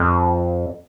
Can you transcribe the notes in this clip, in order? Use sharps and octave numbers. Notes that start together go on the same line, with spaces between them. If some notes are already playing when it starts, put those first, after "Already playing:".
Already playing: F2